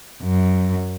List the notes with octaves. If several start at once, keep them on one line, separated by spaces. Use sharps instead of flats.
F#2